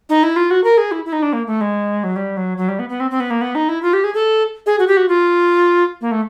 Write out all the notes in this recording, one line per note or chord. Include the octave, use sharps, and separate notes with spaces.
D#4
E4
F4
F#4
A#4
G#4
E4
E4
D#4
D4
A#3
A3
G#3
F#3
G3
F#3
F#3
G3
B3
B3
C4
C4
B3
A#3
B3
D#4
E4
F4
G4
G#4
A4
G#4
F#4
G4
F#4
F4
A#3
A3